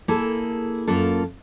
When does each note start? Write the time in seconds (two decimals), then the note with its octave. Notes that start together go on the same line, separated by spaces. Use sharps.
0.08 A#3 E4 G#4 A4
0.87 F#2 A#3 F4 A4